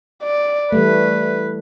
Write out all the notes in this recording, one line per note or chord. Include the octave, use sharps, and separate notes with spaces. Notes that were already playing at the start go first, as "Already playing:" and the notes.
D5
E3 G3 A3 B4